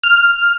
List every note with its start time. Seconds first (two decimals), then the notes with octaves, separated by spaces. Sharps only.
0.03 F6